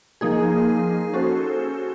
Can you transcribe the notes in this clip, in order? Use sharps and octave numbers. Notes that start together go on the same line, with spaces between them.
F3 A#3 D#4 G#4
C#4 F#4 A4 C5